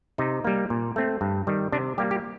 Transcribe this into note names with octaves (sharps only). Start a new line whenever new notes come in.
C3 D#4
G3 A#3
A#2
A3 C4
G2
D#3 G3
C3 D4
G3 A#3 G4
G4